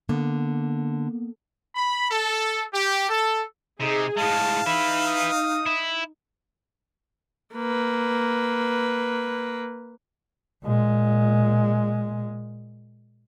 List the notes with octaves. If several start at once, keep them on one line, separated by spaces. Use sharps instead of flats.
D3 A#3 B3
B5
A4
G4
A4
C3 D#4 G#4
A2 G#3 F5 A5
D#4 B4 E5 B5
D#6
E4
A#3 B4
A#2 G#3